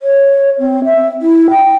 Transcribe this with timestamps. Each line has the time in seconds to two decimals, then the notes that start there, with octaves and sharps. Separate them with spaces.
0.02 C#5
0.59 C4
0.84 E5
1.22 E4
1.51 G5